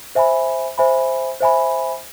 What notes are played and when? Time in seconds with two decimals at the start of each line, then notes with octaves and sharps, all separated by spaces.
0.15 C5 E5 G#5 B5
0.78 C5 E5 G#5 B5
1.41 C5 E5 G#5 B5